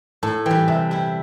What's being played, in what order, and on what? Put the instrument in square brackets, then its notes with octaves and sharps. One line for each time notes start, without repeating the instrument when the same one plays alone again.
[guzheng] A2 [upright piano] A5
[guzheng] E3 G3 [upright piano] G5
[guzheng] C3 [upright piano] E5
[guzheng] G3 E4 [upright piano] G5